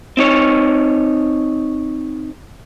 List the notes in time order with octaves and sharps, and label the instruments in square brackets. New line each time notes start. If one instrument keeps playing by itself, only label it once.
[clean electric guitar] C4 D#4 C#5